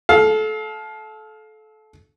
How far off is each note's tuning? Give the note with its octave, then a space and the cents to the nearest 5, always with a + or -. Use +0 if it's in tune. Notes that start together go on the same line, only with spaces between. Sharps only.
A4 -25 F5 +15